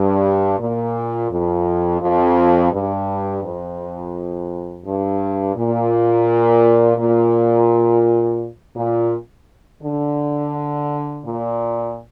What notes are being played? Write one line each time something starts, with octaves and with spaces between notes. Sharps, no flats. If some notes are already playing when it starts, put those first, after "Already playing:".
Already playing: G2
A#2
F2
F2
G2
F2
G2
A#2
A#2
A#2
D3
A#2